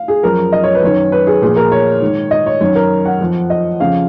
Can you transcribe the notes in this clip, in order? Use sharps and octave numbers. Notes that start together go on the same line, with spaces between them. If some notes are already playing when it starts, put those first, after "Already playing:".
Already playing: F5
G#4
F#2 F3 A#4
D#5
C#5
B4
F#2 D#3 C#5
B4
G#4
A#2 F3 G#4
A#4
C#5
G#2 D#3
D#5
C#5
F#2 D#3 C#5
A#4
F#5
F2 F3
D#5
F2 C#3 F3 F5